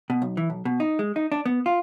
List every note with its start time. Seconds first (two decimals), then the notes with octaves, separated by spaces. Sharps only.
0.10 B2
0.22 B1
0.37 E3
0.50 B1
0.65 B2
0.80 D#4
0.99 G#3
1.16 D#4
1.32 D4
1.46 B3
1.66 F4